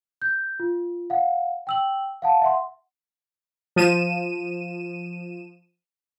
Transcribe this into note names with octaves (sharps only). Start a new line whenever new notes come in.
G6
F4
F5 F#5
G5 E6 F#7
F5 F#5 A5
E5 F#5 C6
F3 D#7 E7